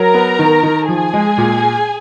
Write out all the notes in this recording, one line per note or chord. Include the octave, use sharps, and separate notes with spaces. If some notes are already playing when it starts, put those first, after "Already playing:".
Already playing: F#3 A#4 A#5
B3
D#3
D#3
F3 G#4 G#5
G#3
A#2